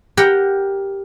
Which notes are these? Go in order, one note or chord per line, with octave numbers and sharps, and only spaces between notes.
G4 A#4 F#5 G5